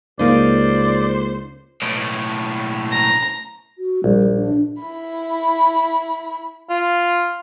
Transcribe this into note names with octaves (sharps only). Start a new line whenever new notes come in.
C#2 A#3 D#4 C5 D5
B1 A2
A#5
F#4
A#1 G3
D4
E4 B5
F4